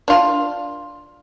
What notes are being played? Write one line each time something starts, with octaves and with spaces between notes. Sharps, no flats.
D4 F4